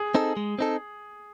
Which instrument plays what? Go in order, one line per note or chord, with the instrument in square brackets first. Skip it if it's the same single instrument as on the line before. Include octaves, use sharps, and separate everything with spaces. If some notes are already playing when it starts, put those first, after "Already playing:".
Already playing: [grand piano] G#4
[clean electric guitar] C4 D#4 A4
G#3
C4 D#4 A4